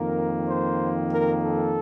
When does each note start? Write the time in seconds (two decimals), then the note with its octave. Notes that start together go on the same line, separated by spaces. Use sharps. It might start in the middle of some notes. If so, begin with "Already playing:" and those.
Already playing: F2 D#3 A#3 A#4
0.46 C5
1.11 A#4
1.43 A4